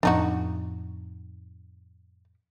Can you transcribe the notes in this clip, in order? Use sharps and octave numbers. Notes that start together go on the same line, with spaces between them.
F2 A2 F3 D4 D#4 F#4